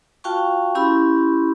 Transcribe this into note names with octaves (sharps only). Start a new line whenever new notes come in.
F4 F#4 F5 G5 A5 C#6
C#4 E4 G4 B5 C6 E6